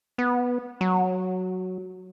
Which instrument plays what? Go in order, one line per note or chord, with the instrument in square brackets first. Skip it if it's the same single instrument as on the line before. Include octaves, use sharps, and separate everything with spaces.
[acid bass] B3
F#3